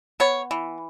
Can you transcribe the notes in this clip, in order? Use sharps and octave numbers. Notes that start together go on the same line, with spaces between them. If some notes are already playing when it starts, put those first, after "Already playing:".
B3 C#5
E3